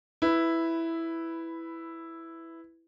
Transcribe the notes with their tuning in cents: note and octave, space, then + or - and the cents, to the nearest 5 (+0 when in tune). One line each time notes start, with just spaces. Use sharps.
E4 +0 B4 +10